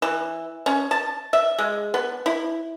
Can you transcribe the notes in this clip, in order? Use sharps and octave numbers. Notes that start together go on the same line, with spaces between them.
E3
C#4
A5
E5
G#3
B3
E4